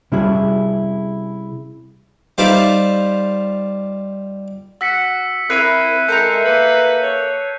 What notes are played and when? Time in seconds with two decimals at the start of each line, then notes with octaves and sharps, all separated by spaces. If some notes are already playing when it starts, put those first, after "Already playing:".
0.12 C3 G3 C#4 E4 F#4 G#4
2.38 G3 D#4 F4 C5 D5 E5
4.81 F#4 E6 B6 C#7
5.50 C4 E4 A#4 E6 F#6 G6 C7 D#7
6.08 G#3 A4 A#4 E5 A#5 G6
6.45 A#3 B4
7.02 C#5